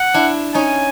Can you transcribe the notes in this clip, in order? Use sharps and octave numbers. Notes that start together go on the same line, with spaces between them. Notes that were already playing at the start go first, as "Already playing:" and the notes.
Already playing: F#5
D4 E4
C#4 D#4 G#5